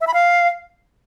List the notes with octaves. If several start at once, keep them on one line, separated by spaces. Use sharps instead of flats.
E5
B5
F5